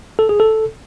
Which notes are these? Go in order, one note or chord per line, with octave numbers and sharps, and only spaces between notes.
A4
G#4
A4